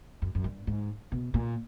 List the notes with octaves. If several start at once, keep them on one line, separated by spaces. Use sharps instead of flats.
F#2
F#2
G2
G#2
B2
A#2